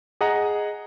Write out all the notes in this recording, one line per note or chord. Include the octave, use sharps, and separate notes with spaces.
G#4 D#5 F#5 A#5